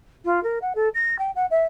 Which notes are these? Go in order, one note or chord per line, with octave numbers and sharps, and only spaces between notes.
F4
A#4
F#5
A4
A#6
G5
F#5
E5